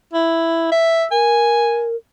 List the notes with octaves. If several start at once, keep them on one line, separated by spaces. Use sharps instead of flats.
E4
E5
A#4 G#5